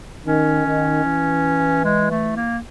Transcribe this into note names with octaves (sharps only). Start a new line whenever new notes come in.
D#3 C#4
D#3
E3
G#3
A3
A#3